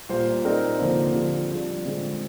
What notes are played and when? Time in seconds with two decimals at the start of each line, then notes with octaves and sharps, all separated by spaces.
0.09 A#2 G3 A#3 F4 C5
0.44 C4 D#4 A#4 D5
0.79 D3 F3 A#3 F4 C5
1.14 D3 F3 C4 G4
1.50 G3 D4 F4 G#4
1.84 D3 G#3 C4 F4